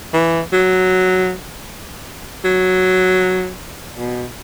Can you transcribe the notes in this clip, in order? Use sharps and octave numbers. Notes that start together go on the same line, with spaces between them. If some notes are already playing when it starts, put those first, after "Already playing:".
E3
F#3
F#3
B2